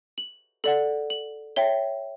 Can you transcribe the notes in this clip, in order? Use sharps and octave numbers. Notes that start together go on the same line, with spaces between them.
F#7
A4 D5 F#5 F#7
F#7
C#5 E5 G5 G7